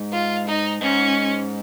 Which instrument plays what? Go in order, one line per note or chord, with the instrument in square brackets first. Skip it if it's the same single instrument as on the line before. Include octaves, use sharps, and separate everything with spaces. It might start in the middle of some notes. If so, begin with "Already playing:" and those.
Already playing: [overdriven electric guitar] G#2
[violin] F4
D#4
[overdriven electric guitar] G#2 [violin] C#4